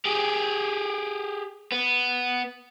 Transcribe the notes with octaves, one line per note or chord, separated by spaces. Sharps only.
G4 G#4
B3